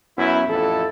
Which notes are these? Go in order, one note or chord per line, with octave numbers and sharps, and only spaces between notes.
F#2 B3 E4
A1 F2 E4 A4